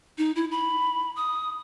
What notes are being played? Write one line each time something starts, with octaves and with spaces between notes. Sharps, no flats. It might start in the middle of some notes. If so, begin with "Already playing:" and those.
D#4
E4
B5
D#6